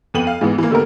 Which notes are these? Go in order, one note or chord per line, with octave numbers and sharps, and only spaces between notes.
F2 B3 D#7 F#7
F5
G#2 E3 B3
E3 A#3
D3 A3 B3 G4 A#4